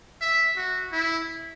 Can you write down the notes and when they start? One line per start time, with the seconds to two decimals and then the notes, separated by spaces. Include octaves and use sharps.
0.22 E5
0.57 F#4
0.92 E4